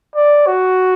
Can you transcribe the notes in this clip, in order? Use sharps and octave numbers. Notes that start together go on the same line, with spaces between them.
D5
F#4